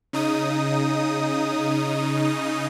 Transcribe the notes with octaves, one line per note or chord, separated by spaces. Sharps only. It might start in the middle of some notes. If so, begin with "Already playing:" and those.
C#3 D#4 D#6